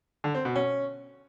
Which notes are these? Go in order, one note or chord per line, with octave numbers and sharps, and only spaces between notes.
D3
C4
B2
C#4